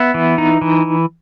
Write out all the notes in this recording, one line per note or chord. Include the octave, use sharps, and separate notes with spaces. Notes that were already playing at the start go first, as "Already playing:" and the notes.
Already playing: B3 E5
E3
D#4
E3